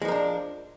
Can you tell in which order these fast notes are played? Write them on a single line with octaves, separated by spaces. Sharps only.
G#3 F3 A#4 D4